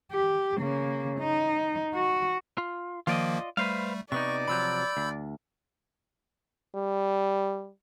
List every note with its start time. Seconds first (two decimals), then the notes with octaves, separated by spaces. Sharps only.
0.12 G4
0.59 C#3 A#3
1.20 D#4
1.95 F#4
2.58 F4
3.07 D#3 F3 A#3 F4 D5 D#5
3.57 G3 A3 B4 C5 F5
4.12 C3 B3 D#4 D5 C#6
4.48 C3 F3 F#3 B5 E6 G6
4.97 D2
6.75 G3